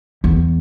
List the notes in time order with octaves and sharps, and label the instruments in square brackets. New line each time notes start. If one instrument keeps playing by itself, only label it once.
[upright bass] E2